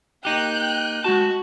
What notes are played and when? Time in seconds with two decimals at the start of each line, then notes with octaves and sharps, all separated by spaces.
0.25 A#3 D#4 G4 G5 F#6 G6
1.04 G#3 F#4 A5